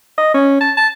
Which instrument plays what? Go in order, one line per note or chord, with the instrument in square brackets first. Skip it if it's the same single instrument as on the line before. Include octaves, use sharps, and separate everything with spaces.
[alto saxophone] D#5
C#4
A5
A5